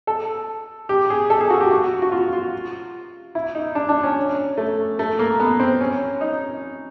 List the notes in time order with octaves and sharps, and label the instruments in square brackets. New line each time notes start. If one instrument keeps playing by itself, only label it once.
[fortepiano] A4
G4
G#4
A4
G#4
F#4
G4
F#4
F#4
F4
F4
E4
D#4
D4
D4
C#4
A3
A3
A#3
B3
C4
C#4
D#4